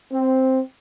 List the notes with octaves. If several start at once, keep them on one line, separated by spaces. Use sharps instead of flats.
C4